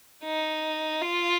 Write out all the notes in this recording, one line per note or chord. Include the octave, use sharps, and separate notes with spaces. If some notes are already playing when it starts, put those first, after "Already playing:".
D#4
F4